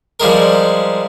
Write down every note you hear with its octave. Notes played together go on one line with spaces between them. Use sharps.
F3 G3 G#3 A#4